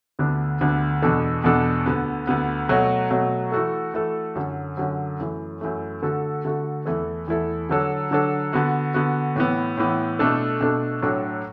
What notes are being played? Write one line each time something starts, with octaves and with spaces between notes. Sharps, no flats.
D2 D3 B3 D4
D2 D3 B3 D4
E2 B2 B3 D4 A4
E2 B2 B3 D4 A4
D2 D3 B3
D2 D3 B3
B2 F#3 A3 F#4
B2 F#3 A3 F#4
E3 A3 F#4 A4
E3 A3 F#4 A4
F#2 D3 F#3
F#2 D3 F#3
F#2 E3 A3
F#2 E3 A3
D3 A3 F#4 A4
D3 A3 F#4 A4
E2 E3 A3 E4 A4
E2 E3 A3 E4 A4
D3 F#3 D4 A4
D3 F#3 D4 A4
D3 B3 F#4
D3 B3 F#4
A2 E3 B3
A2 E3 B3
B2 A3 D4 A4
B2 A3 D4 A4
A2 F#3 D4 F#4 A4